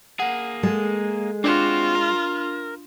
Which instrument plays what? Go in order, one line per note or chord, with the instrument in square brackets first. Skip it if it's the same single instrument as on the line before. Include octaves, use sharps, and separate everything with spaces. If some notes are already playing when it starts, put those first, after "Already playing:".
[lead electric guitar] A#3 G#4 [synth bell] F#5
[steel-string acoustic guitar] G#3 [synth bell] A4
[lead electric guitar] C4 F#4 [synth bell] D4 E7 [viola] F4
[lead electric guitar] A#4